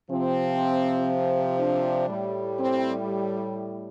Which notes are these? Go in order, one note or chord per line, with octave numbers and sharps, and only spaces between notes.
C3 F3 C4
D4
A2 G3
C4